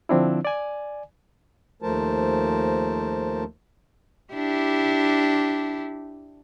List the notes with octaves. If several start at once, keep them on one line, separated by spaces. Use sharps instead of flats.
D3 F3 C4 D4 E4
D5 G#5
D#2 F3 A3 A#4 C5 A5
D4 E4 G4